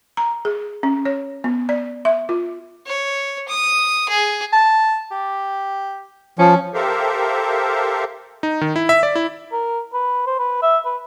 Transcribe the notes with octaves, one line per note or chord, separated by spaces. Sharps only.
A#5
G#4
C#4
C#5
B3
D5
E5
F4
C#5
D#6
G#4
A5
G4
F3 C#4
G4 A4 A#4 C5 E5 F5
D#4
D#3
E4
E5
D5
E4
A#4
B4
C5
B4
E5
B4